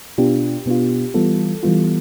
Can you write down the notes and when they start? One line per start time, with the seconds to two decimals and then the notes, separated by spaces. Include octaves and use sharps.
0.18 B2 B3 D4 F4 G4
0.66 B2 B3 D4 F4
1.14 E3 G3 B3 F4 A4
1.63 E3 G3 B3 F4